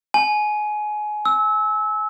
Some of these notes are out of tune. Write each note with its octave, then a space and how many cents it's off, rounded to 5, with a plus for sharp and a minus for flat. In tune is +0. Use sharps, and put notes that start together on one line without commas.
G#5 +25
E6 -25